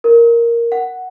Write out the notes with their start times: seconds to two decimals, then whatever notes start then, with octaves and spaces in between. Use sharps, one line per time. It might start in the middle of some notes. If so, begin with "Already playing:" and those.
0.04 A#4
0.72 F#5